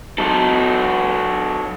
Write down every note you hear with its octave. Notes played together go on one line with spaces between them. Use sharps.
F#3 A4